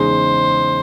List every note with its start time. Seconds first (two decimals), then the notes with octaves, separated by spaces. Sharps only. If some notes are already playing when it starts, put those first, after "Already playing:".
Already playing: E2 C#3 G#3 D#4 G#4 C5